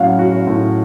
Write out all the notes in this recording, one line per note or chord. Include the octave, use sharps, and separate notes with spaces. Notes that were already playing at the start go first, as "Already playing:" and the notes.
Already playing: A2 F#3 C#4 F5 F#5
F#4
C#5
A2